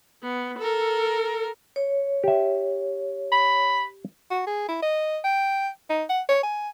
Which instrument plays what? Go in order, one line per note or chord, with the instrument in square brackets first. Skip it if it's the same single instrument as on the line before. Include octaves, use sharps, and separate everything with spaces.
[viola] B3
A4 A#4
[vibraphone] C#5
[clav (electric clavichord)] G4 E5
[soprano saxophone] B5
F#4
G#4
E4
D#5
G5
D#4
F#5
C#5
G#5